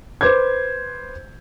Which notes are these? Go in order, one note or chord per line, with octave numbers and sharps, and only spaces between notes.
B4 C5 D6 G6 G#6